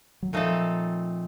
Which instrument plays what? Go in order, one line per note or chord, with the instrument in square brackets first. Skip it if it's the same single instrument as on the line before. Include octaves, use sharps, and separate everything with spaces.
[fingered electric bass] F#3
[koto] A#2 A3 C4 D#4 A4 [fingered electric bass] F3